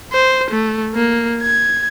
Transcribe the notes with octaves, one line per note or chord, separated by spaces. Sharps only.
C5
A3
A#3
G#6